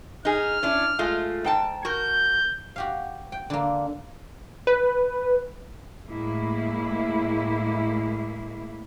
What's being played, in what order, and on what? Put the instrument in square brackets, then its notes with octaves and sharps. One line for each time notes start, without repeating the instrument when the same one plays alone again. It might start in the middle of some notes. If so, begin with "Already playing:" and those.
[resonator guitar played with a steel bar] D#4 G#4 [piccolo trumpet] F6
[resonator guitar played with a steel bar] C#4 D4 E4
G#3 A3 F4
G#2 G5 A5
[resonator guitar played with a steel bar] F#4 A#4 [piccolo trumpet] G6
[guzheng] F#4 G4 F5
G5
D3 A#3
[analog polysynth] B4
[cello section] A2 G#3 A#3 E4